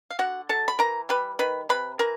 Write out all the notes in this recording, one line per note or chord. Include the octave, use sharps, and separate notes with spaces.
F5
D3 F#4 F#5
F#3 A4 A5
B5
E3 A#4 A#5
G3 B4 B5
D#3 B4 B5
C3 B4 B5
E3 A#4 A#5